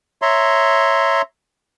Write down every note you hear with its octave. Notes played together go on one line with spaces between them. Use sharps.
C#5 E5 A#5 C6